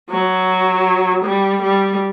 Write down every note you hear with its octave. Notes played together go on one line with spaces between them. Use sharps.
F#3
G3
G3